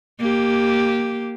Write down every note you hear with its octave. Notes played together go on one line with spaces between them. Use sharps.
A#3 G4